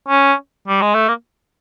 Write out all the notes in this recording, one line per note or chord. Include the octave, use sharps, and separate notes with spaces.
C#4
G3
G#3
A3
A#3